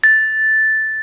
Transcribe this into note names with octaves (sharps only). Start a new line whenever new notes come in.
A6